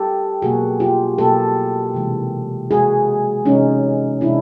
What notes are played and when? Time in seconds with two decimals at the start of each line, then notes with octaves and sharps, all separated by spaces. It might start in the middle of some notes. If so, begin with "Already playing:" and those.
Already playing: G4 A4
0.42 B2 F#3 A#3 F#4 G#4
0.80 F4 G4
1.18 B2 F#3 A#3 G4 A4
1.94 C3 E3 G#3
2.71 C3 E3 G#3 F#4 G#4
3.46 C3 E3 G#3 C#4 D#4
4.21 C3 E3 G#3 D4 E4